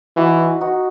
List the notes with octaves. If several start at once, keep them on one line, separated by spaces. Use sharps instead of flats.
E3 D#4 F#4
D#4 F#4